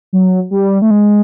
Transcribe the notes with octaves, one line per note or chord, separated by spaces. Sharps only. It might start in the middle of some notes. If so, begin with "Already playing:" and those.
F#3
G3
A3
G#3